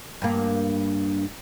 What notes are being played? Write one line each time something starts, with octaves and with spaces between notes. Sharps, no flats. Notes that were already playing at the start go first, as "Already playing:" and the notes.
G2 A#3